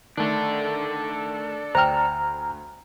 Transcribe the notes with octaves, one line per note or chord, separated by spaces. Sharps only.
D#3 A3 D4 A4
D2 C5 G5 A#5 F6